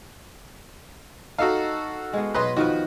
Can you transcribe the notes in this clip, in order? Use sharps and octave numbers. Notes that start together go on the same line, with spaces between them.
D#4 F#4 A4 F5
G#3 B3
B2 F#3 B4 D#5 C6
D#3 F3 F#4 B4